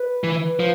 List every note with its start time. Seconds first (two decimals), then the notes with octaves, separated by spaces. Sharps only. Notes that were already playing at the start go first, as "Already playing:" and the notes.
Already playing: B4
0.24 E3
0.60 F3